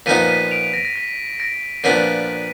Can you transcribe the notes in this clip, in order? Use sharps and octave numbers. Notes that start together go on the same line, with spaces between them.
A#2 F3 B3 D#4 B6 D#7
B6 D#7
D7 F7
A#6 D7
A#6
B6
A#6 D7
A#2 F3 B3 D4 B6 D#7